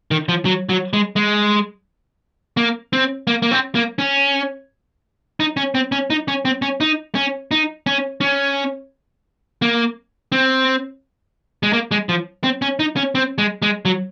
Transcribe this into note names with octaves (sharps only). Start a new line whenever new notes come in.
D#3
F3
F#3
F#3
G#3
G#3
A#3
C4
A#3
A#3
C4
A#3
C#4
D#4
C#4
C4
C#4
D#4
C#4
C4
C#4
D#4
C#4
D#4
C#4
C#4
A#3
C4
G#3
A#3
G#3
F3
C4
C#4
D#4
C#4
C4
G#3
G#3
F#3